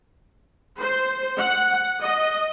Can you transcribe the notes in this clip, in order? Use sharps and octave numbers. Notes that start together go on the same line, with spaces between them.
C5
F#5
D#5